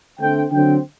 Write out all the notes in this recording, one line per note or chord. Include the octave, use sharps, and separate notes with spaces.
D3 A3 C4 G5
D3 F#3 C4 G5